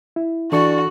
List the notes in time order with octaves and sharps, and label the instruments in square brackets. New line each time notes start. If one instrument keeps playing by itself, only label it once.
[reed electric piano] E4
[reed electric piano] E3 A4 C#6 [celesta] D4 [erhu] F#4 [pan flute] D5